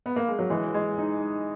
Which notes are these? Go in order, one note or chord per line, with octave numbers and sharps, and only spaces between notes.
B3
A#3
G#3
F#3
E3 G#3
G#3
D#4